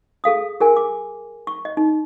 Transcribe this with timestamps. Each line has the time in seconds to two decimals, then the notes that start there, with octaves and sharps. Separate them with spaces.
0.24 G#4 A4 F5 D#6
0.60 G#4 A#4 G#5
0.77 D6
1.47 C#6
1.65 D#5
1.77 D#4